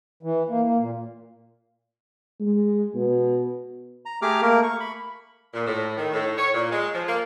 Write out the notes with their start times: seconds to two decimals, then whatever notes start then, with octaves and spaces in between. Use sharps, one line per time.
0.23 E3
0.49 A#3
0.66 A#3
0.78 A#2
2.40 G#3
2.95 B2
4.05 A#5
4.22 A3 G4 G#4 A#5 D6 F6
4.42 A3 A#3 A#4
4.63 C#6
4.80 B5
5.54 A#2
5.67 A2
5.98 D#3
6.13 A2
6.38 C#5
6.54 A#2
6.71 G#3
6.95 F3
7.09 A#3